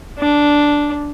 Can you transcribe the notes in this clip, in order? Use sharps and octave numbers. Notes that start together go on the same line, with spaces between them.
D4